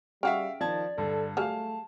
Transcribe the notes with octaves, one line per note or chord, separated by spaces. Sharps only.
C#3 G3 F#4 E5 F5 G5 F6
D#3 F3 D5 A5 G#6
G2 D3 A4
F#3 G3 A3 G#4 F5 A5 F6